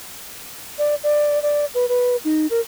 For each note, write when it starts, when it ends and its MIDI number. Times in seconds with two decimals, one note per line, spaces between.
0.78 0.95 74
1.04 1.41 74
1.42 1.65 74
1.75 1.88 71
1.89 2.16 71
2.25 2.47 63
2.50 2.60 70